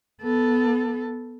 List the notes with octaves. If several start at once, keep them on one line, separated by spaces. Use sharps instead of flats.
B3 A4